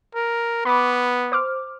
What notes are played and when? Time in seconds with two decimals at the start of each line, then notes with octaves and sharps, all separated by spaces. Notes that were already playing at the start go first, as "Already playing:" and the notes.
0.15 A#4
0.65 B3 B5 D6
1.32 C5 D6 F6